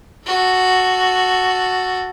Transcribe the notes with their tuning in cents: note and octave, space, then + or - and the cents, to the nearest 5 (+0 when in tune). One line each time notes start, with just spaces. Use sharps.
F#4 +0 A4 +0